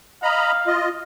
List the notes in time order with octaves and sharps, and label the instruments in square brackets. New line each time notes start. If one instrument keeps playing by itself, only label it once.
[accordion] D#5 A#5 B5 [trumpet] F5
[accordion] F4 D#5